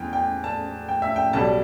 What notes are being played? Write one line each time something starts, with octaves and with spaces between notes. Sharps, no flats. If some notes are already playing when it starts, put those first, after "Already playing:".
Already playing: E2 G5
G5
A5
G5
E5
G5
B1 B2 G3 A5